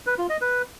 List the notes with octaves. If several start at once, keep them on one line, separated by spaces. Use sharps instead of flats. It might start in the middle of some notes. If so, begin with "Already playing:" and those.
B4
F4
D#5
B4